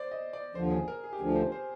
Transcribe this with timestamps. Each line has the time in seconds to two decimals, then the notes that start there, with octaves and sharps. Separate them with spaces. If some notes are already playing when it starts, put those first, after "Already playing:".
Already playing: C5 D5
0.11 D#5
0.33 D5
0.55 D#2 D3 F3 C5
0.71 G#4
0.88 A#4
1.04 G#4
1.13 G4
1.20 D2 D3 F3 G#4
1.35 C5
1.52 C5